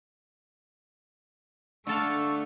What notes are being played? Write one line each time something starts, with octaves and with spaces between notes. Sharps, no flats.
D3 A3 D4 A4 F5 C#6 E6